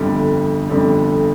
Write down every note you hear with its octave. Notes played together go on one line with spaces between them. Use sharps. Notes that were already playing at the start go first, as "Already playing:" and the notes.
Already playing: G1 F2 D3 G3
G1 F2 D3 G3